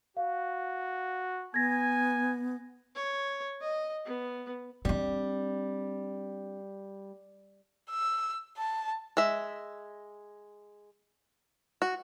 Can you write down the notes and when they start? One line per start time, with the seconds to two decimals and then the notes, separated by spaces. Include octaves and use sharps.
0.17 F#4 F5
1.54 B3 G#5 G#6 A#6
2.95 C#5
3.61 D#5
4.05 B3
4.85 G3 C4 D4
7.90 E6
8.58 A5
9.17 G#3 E5
11.82 F#4